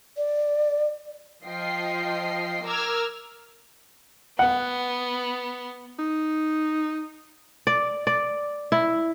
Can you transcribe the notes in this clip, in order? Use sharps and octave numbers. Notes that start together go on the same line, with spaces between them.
D5
F3 D#5 G5 C7
A#4 A#5 D6 E6 F6 G#6
B3 F#5
D#4
D5
D5
E4